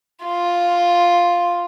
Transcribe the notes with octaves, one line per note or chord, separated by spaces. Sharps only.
F4